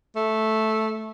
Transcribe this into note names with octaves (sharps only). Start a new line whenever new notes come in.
A3